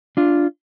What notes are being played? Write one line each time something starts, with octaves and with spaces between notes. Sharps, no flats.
D4 F4